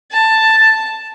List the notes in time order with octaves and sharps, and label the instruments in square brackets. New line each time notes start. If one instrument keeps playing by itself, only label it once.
[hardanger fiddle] A5